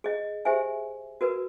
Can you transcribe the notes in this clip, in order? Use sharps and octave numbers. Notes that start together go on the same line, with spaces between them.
G#4 D#5
G4 G#4 C5 E5 G#5
F#4 A#4 B4